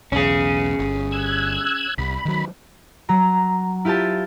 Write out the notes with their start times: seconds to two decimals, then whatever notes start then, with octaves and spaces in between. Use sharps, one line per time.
0.12 B1 E2 C#4 G#4
0.79 G1
1.12 E6 F#6 G#6
1.98 C2 B5
2.25 D#3 F#3
3.09 F#3 A#5
3.85 E4 F4 G4 C5 A5